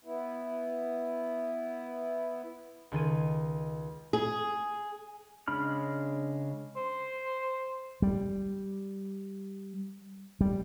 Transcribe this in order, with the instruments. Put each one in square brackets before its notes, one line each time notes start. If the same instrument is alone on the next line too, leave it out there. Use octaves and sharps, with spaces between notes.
[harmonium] B3 E4
[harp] C#2 D#3 A4 G#6 D#7
[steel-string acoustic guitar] G#4
[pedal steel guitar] C#3 G#3 D4 B5 F6
[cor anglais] C5
[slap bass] G3
G3